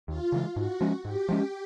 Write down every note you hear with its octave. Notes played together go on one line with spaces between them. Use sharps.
D#2 F4
C#3 E3 G#3
G#2 F#4
F3 G#3 C#4
G#2 G4
F3 G#3 C#4